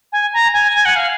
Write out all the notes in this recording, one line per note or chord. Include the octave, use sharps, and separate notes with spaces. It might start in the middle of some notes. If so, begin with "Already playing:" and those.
G#5
A#5
G#5
G#5
F#5
F5